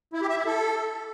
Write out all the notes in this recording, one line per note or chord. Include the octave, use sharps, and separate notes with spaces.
E4
G4
E5
E4
A4